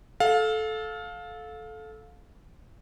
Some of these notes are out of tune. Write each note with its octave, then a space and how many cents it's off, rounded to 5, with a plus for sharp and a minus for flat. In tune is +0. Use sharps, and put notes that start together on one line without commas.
A4 -15 F5 +20